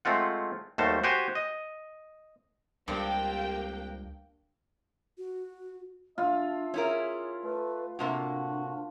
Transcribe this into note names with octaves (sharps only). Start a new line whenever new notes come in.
G#3 A3 C4 F4 F#5
D#2 G3 A3 F#4 C5 A5
F#4 G4 C5 G#5
D#5
C#2 G2 A#3 C4 D4 G4 G5
F#4
D4 F4 E5
C#4 E4 G#4 A#4
A3 B4
A2 C3 A#3 D4 F#4